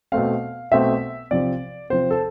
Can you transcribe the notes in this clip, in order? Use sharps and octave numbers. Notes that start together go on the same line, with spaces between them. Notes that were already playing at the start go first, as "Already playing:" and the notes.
B2 A3 C4 F5
B2 A3 C4 E5
C3 F3 C4 D5
C3 F3 C4 C5
A4